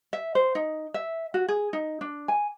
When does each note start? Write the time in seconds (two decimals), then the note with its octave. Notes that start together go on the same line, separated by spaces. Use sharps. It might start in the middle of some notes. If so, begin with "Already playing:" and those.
0.13 E5
0.35 C5
0.55 D#4
0.94 E5
1.34 F#4
1.48 G#4
1.73 D#4
2.01 D4
2.28 G#5